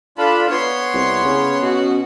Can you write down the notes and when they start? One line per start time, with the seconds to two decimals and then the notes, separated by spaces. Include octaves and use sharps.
0.18 D4 F4 A4 B5
0.50 B3 C#5 C6
0.94 C2
1.24 C#3 C#4
1.62 B2 F#4